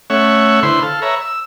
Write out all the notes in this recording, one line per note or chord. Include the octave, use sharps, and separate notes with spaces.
A3 C#4 C#5 E5 F#5
D3 E4 B4 C5 C6
A4 F5
B4 C#5 E5 A#5
E6